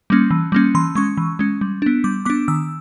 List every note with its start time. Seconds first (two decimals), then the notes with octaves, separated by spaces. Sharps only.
0.10 G3 A#3 C#4
0.31 E3
0.52 G3 A#3 C#4
0.75 E3 C6
0.95 G#3 C#4 C#6
1.17 E3
1.39 G#3 C#4
1.61 G3
1.82 B3 D4
2.04 G3 D6
2.25 B3 D4 D6
2.48 D#3 E6